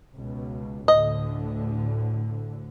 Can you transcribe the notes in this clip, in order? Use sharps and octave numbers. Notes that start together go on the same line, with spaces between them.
C#2 B2
D2 A2 D3 D#5